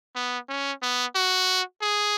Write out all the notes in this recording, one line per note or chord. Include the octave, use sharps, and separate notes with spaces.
B3
C#4
B3
F#4
G#4